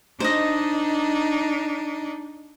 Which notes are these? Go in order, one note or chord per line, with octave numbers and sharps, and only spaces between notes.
D4 D#4 C5 D#5